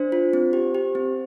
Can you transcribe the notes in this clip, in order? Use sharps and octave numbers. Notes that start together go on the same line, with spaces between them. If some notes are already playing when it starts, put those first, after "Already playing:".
Already playing: D4 C5
F4
C4
G4
G4
C4